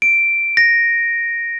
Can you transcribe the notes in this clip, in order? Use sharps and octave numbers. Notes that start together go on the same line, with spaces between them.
D7
A#6